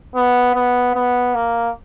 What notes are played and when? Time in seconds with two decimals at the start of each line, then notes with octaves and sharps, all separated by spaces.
0.16 B3
0.55 B3
0.95 B3
1.35 A#3